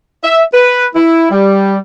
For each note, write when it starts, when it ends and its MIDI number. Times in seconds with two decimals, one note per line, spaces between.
0.24 0.43 76
0.54 0.86 71
0.95 1.27 64
1.31 1.76 55